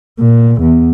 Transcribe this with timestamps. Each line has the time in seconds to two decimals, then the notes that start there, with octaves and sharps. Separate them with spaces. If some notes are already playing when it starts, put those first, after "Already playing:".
0.19 A#2
0.62 E2